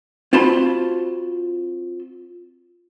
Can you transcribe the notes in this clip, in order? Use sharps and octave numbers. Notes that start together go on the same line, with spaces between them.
C4 F4 F#4 A5 B5 C6